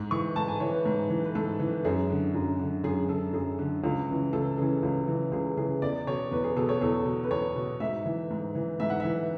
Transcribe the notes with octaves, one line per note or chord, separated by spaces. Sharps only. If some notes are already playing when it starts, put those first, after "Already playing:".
Already playing: G#2
E3 C#6
G#2 A5
G#5
E3 C#5
B4
G#2
E3
B4
G#2 A4
E3
F#2 G#4
D3
F#2
D3
F#2 G#4
D3 A4
F#2 G#4
D3
C#2
C#3 E3
C#2 A4
C#3 E3 G#4
C#2
C#3 E3
C#2 G#4
C#3 E3 G#4
E2 D5
B2 C#5
E2 B4
G#4
B2 A4
C#5
E2 A4
B2
B4
E2 C#5
B2
G#2 E5
E3
G#2
E3
G#2 E5
F#5
E3 E5